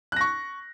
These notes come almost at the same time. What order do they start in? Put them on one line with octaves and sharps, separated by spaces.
F#6 A#6 C#6